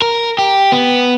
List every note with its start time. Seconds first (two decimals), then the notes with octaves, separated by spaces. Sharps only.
0.02 A#4
0.38 G4
0.72 B3